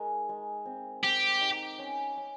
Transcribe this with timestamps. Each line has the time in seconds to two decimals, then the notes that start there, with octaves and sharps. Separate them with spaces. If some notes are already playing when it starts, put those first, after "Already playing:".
Already playing: G#3 D#4 A#4
0.29 G#3
0.65 C4
1.04 C4 G4
1.41 D#4
1.79 C#4
2.17 C#4